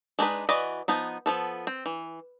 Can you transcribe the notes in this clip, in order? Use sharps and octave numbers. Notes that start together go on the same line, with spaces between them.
G#3 D4 D#4 B4
E3 F#4 B4 D5 D#5
F3 B3 D#4
F3 B3 A4
C4
E3